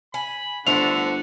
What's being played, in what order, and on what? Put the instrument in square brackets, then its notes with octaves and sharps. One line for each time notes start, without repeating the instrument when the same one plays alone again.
[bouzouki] G#5 [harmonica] B5
[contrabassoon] G1 [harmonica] D3 F#5 [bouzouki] A3 C5 E5 [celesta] F7